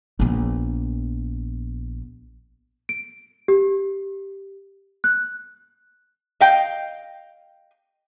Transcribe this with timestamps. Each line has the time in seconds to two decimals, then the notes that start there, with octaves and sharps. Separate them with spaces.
0.20 A#1 B3
2.89 D7
3.48 G4
5.04 F#6
6.40 D#5 F5 G5